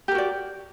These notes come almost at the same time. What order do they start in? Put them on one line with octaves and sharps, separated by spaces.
G4 A#4 F#4 D5